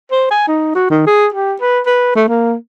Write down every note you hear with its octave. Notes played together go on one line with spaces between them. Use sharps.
C5
G#5
D#4
F#4
D#3
G#4
G4
B4
B4
A3
A#3